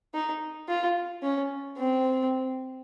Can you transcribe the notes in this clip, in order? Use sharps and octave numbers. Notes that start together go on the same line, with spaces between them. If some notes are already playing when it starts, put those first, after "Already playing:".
D#4
F4
C#4
C4